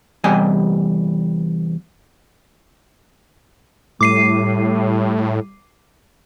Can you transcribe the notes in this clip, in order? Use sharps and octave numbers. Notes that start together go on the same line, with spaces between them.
E2 C3 G3 D#5 G#5
A2 G3 D6 C7 D#7